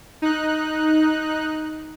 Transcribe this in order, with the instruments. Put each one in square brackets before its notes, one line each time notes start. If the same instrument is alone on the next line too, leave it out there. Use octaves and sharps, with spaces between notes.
[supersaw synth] D#4 F#6